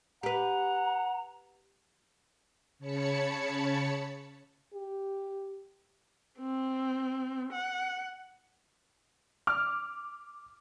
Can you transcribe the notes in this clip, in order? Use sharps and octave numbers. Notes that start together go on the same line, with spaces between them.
G4 B4 F#5 A#5
C#3 C#5 A5 B5 C#7
G4
C4
F#5
D6 F6